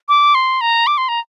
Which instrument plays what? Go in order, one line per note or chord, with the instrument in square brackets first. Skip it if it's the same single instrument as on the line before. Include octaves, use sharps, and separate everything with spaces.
[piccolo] D6
C6
A#5
D6
C6
A#5